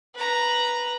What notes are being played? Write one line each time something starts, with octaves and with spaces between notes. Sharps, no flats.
B4 A#5